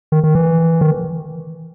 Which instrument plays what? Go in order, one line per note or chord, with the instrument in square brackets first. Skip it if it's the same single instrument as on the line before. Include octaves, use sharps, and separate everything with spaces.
[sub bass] D#3
D#3
E3
D#3